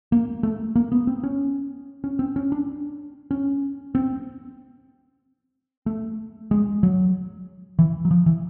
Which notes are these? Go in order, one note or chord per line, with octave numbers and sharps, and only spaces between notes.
A#3
A3
A#3
B3
C4
C#4
C#4
C4
C#4
D4
C#4
C4
A3
G#3
F#3
E3
F#3
F3
E3